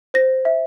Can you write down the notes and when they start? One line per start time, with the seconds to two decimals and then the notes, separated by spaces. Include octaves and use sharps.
0.14 C5 A#6
0.45 E5